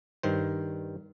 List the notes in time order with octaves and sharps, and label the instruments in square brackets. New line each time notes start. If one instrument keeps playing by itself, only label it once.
[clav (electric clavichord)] G2 D#3 C5